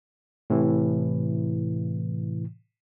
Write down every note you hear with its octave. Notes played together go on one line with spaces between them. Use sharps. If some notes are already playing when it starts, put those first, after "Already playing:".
A2 C3 E3